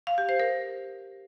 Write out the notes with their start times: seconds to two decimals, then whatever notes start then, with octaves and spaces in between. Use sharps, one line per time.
0.07 F5
0.18 G4
0.29 C5
0.40 A#4